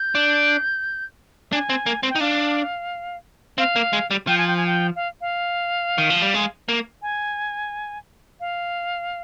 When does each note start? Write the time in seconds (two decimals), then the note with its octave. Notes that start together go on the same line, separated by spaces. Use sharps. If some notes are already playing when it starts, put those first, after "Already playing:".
Already playing: G6
0.15 D4
1.52 D4 G#5
1.69 C4
1.86 A#3
2.03 C4
2.10 G5
2.15 D#4
2.20 D4 F5
3.58 C4 F5
3.76 A#3
3.93 G#3
4.11 G3
4.27 F3 G5
4.38 G#5
4.47 G5
4.57 G#5
4.67 G5
4.96 F5
5.21 F5
5.98 D#3
6.10 F3
6.22 G3
6.34 G#3
6.68 A#3
7.02 G#5
8.40 F5